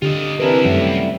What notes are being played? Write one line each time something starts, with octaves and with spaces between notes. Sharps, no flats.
D3 F4 G4 D#5
C3 E3 C4 D4 E4 G4 A#4 B4
F#2 D#3 G3 A3